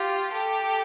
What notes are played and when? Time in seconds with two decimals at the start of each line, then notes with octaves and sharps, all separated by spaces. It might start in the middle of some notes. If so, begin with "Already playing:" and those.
Already playing: F4 G4
0.32 G4 A4